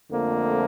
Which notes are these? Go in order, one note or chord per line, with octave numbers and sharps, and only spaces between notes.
F2 D3 F3 A3 A#3